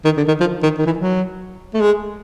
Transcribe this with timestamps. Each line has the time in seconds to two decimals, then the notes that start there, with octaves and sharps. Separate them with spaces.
0.05 D#3
0.17 D3
0.28 D#3
0.40 F3
0.63 D#3
0.78 D#3
0.86 E3
0.98 F#3
1.74 A3
1.81 G#3